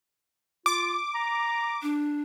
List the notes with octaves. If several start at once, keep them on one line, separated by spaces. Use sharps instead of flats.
F4 D6
A#5
D4